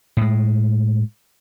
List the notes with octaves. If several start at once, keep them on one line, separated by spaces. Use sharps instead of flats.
A2 G#3